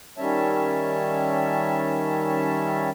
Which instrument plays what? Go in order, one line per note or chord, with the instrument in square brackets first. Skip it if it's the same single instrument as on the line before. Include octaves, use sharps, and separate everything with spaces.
[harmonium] D#3 G3 C#4 C#5 E5 A5